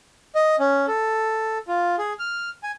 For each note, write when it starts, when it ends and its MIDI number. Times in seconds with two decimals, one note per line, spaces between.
0.35 0.56 75
0.60 0.86 61
0.88 1.58 69
1.68 1.96 65
1.98 2.13 68
2.19 2.49 89
2.63 2.71 80